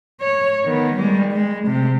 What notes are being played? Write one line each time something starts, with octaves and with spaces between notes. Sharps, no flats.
C#5
D#3 B3
G3 G#3
G#3
C3